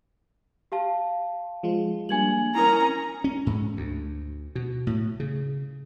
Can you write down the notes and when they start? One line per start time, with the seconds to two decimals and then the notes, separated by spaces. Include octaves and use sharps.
0.72 G4 F5 A5
1.63 F3 G#3 F4
2.09 G3 A#3 D4 G#5 G#6 F#7
2.55 C#4 E4 A#4 G#5 A#5 D#6 G#6
3.24 C#4
3.47 G#2
3.77 D2
4.55 B2
4.87 A2
5.20 C#3